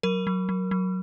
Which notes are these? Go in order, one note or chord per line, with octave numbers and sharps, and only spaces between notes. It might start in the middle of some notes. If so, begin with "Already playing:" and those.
F#3 A#4
F#3
F#3
F#3